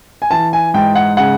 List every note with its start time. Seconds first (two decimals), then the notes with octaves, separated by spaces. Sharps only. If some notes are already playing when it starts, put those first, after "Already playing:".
0.22 G#5
0.31 E3 A5
0.53 G#5
0.74 G#2 G5
0.95 F#5
1.17 C#3 F#5